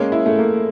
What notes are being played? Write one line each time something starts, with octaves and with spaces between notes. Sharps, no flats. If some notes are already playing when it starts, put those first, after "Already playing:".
Already playing: G#3 A#3 C#4
E4
A3
A#3